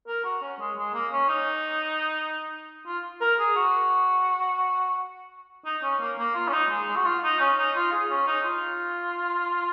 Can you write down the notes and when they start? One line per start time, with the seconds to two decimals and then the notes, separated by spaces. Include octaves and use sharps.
0.07 A#4
0.24 F#4
0.42 C#4
0.60 G#3
0.77 G#3
0.94 A#3
1.12 C#4
1.29 D#4
2.87 F4
3.21 A#4
3.39 G#4
3.56 F#4
5.65 D#4
5.83 C#4
6.00 A#3
6.18 A#3
6.35 F4
6.48 C#4
6.52 D#4
6.70 G#3
6.88 G#3
6.96 F#4
7.05 F4
7.23 D#4
7.40 C#4
7.58 D#4
7.76 F4
7.92 G#4
8.10 C#4
8.27 D#4
8.45 F4